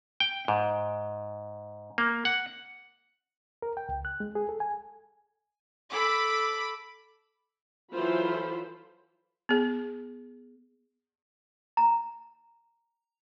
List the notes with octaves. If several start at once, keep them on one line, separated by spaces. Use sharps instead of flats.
G5
G#2
A#3
F#5
A#4
G5
C#2
F#6
G#3
G#4
A4
G#5
A4 B5 D6
E3 F#3 F4 A4 C5 B5
B3 G#4
A#5